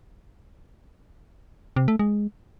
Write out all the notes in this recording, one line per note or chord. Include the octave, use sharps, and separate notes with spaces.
C3
A3
G#3